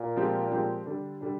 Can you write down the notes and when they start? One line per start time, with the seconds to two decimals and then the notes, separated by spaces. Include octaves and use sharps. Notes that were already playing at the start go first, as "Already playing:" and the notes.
Already playing: A#2
0.16 F3 G#3 C4 G4
0.51 F3 G#3 C4 G4
0.86 D3 G3 D4
1.21 D3 G3 D4